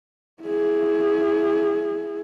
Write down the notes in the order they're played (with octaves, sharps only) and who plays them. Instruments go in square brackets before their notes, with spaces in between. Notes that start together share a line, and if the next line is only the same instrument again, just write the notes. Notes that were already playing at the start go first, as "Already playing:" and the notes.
[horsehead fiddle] E4 G#4